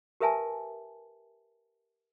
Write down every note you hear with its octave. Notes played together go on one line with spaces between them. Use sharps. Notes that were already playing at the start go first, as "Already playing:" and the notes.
G4 A#4 B4 E5 G#5 A5